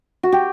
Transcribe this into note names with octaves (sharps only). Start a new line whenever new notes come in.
F#4
G4